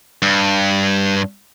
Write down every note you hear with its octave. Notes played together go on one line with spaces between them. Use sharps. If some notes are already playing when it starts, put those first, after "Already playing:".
G2